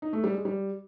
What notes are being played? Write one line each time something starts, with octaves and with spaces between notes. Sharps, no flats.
D#4
A3
G3
G#3
G3